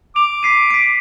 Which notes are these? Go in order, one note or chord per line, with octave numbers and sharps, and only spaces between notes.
D6 F7
B6 C7 D#7
B6 D7